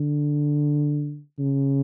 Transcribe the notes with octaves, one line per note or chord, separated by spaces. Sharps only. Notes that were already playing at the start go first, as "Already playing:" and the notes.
Already playing: D3
C#3